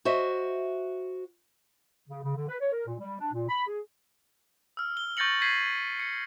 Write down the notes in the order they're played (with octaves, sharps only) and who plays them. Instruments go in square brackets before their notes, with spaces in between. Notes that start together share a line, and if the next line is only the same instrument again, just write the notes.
[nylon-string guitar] F#4 C5 D#5 E5
[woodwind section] C#3
C#3
D3
B4
C#5
A#4
A#2
G3
D4
A#2
B5
G#4
[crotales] E6 F6
G7
C#6 G6 A6 A#6 C#7 F#7
G6 G#6 B6 C7 D#7
C#7